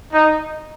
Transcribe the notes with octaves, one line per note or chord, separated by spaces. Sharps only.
D#4